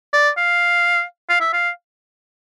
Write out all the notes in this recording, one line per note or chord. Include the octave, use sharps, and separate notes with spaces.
D5
F5
F5
E5
F5